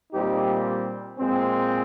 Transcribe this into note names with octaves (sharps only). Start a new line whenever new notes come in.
A#2 G3 C4 D#4 G4
A#2 G#3 C4